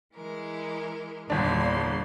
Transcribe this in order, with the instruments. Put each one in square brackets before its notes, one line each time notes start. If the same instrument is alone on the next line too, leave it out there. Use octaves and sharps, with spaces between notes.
[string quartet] E3 G#3 A#4
[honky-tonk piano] G1 D4 [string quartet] E2 A#2 C6